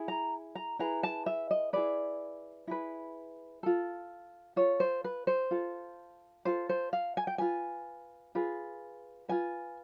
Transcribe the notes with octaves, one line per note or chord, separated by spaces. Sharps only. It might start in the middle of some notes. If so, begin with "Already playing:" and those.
Already playing: E4 G#4
A#5
A#5
E4 G#4 B4 A#5
A5
E5
D#5
E4 G#4 B4 D5
E4 G#4 B4
F4 A4
F4 A4 C#5
C5
B4
C5
F4 A4
F4 A4 C5
C5
F5
G#5
G5
F4 G#4 B4 G#5
F4 G#4 B4
F4 G#4 B4 G#5